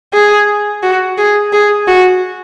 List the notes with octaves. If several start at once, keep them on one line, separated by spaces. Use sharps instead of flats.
G#4
F#4
G#4
G#4
F#4